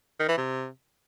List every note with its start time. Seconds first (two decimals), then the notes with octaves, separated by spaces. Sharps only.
0.20 D#3
0.29 E3
0.38 C3